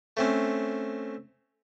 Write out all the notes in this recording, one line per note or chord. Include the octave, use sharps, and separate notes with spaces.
A3 C4 C#4